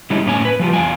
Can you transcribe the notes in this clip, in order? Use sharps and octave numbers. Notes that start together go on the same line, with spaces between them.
D3 G3 G#3 C#4 D#4 E4
A2 A#3 C#4 C#5 G#5
B4
F3 G3 F4
E2 F5 G#5